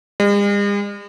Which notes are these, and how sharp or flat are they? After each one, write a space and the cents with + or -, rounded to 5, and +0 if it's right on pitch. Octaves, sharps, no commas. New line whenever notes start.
G#3 -45